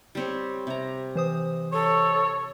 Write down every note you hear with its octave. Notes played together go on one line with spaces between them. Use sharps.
G3 C4 C#5
C3 A#5
E3 C5 D#6
A4 C#5